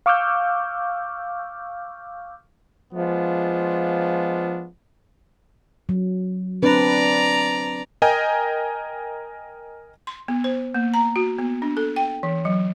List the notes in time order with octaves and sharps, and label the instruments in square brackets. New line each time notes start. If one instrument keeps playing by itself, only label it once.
[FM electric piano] F5 C#6 D6 E6 F6 G6
[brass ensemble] F3 G#3 B3 D4 F4
[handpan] F#3
[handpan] C4 D4 B4 [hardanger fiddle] D5 A#5
[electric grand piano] A#4 D#5 G5 G#5 A#5
[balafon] C6
B3
C5
A#3
A#5
F#4
B3
D4
A4
G5
E3
F#3